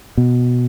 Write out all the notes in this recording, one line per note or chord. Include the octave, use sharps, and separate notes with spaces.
B2